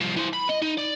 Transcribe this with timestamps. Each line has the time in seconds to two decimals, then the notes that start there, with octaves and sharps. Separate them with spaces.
0.01 C2 F3
0.17 E3 C5
0.33 B5
0.49 D#5
0.62 D#4
0.78 D5